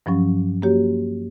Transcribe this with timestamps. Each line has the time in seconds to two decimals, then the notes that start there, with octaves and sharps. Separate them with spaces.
0.06 G2 F3 F#3 C#4
0.62 A#3 F#4 G4 C#5